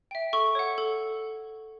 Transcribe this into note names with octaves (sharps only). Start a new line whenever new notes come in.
E5 G5
A4 C#6
C#5 F#5
A4